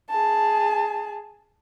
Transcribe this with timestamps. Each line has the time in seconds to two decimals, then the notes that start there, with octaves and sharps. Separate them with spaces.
0.10 G#4 A5